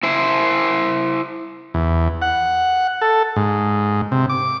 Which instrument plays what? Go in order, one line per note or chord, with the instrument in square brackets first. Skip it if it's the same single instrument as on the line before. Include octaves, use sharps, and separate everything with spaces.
[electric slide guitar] E4 C5
[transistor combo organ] E2
F#5
A4
G#2
C3
D6